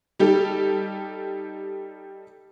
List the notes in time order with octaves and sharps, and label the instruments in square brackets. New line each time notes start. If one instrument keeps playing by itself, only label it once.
[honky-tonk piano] G3 D#4 G4 A4